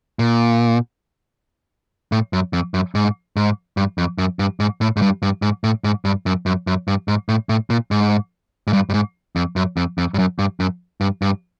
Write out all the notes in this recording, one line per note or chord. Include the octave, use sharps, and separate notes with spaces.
A#2
A2
F#2
F2
F#2
G#2
G#2
G2
F2
F#2
G2
G#2
A2
G#2
G2
G2
G#2
A2
G#2
G2
F#2
F#2
F#2
G2
G#2
A2
A2
A#2
G#2
G#2
G2
G2
G#2
F2
F#2
F2
F2
G2
F#2
G2
F#2
G2
G2